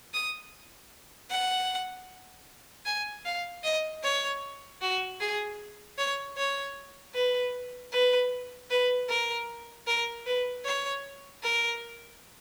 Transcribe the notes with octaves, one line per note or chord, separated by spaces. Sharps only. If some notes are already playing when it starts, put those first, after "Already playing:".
D#6
F#5
G#5
F5
D#5
C#5
F#4
G#4
C#5
C#5
B4
B4
B4
A#4
A#4
B4
C#5
A#4